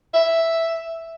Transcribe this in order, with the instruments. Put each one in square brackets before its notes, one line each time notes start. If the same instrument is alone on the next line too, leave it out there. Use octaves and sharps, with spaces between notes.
[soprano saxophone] E5